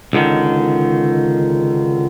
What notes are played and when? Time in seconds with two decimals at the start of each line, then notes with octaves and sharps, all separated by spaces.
0.13 C#2 D3 D#3